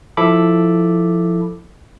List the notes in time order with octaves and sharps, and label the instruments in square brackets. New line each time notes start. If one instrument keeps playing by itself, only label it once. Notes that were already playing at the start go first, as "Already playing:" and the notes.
[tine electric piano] F3 E4 A4 B5 D6